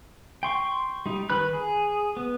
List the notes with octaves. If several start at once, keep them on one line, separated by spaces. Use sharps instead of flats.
G5 C6 C#6
G3 D#4
D#3 B4 B5 F#6
G#4
B3